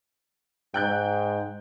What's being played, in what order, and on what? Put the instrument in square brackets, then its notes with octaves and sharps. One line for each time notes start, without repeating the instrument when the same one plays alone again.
[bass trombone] G#2 [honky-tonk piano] G5 F#6 G6